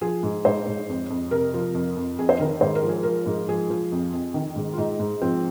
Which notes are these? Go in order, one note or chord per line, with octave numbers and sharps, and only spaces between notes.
F3 G#4
G#2
G#2 C5
G#2
F2
F2
C3 A#4
F3
F2
F2
F2 G#4
C5
D#3 A#4
G#2 C5
A#4
F3
G#4
F3 A#4
G#2
F3 G#4
F3
F2
F2
D#3
G#2
F4
G#2 D#4
G#2
F3 C4